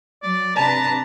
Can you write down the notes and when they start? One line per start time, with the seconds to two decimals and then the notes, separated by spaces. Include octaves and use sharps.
0.23 F#3 D5
0.56 C3 D4 B4 A5 A#5